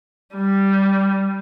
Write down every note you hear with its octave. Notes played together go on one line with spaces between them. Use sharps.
G3